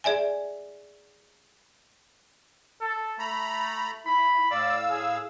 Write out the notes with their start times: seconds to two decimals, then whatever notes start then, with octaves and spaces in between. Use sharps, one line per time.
0.04 G#4 D5 E5 G#5
2.81 A4
3.19 A3 A#5 B5
4.06 E4 B5
4.51 A2 D5 F5 E6
4.90 G#4